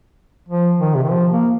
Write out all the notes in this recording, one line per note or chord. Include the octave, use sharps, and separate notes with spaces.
F3
D#3
C3
D#3
F3
A#3